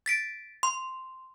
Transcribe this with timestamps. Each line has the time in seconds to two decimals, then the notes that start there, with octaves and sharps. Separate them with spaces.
0.06 A6 B6 D7
0.63 C6